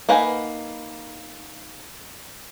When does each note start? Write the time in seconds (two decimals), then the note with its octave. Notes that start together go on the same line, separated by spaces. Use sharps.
0.09 A#3 D#4 B4 F#5 G#5